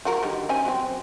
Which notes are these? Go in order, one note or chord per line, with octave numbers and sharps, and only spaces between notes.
F3 F#4 A#4
D3 D#3 G3
C#4 C5 G#5
F#3 C4